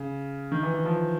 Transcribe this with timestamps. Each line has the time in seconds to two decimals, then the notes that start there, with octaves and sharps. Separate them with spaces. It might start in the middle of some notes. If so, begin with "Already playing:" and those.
Already playing: C#3
0.52 D#3
0.63 E3
0.74 E3
0.85 F3